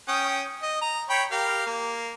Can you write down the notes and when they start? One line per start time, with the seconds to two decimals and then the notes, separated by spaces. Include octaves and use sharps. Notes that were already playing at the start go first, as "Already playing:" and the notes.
0.08 C#4 G5 D#6
0.63 D#5
0.82 A#5
1.10 C#5 G5 B5
1.32 G4 A#4 F5
1.66 A#3